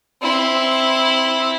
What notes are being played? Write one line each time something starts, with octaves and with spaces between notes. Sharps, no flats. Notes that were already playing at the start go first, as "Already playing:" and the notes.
C4 E4